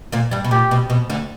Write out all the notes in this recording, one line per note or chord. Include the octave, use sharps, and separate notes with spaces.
A#2 A#3
G2 G3
B2
A#2 G4
B2
B2
D2 D3